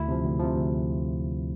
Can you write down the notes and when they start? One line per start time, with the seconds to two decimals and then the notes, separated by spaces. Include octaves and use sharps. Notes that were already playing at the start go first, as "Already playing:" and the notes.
Already playing: D2 E4
0.08 C3 F3
0.24 D2
0.39 C3 F3
0.56 D2